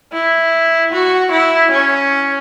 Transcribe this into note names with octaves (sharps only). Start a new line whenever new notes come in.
E4
F#4
E4
C#4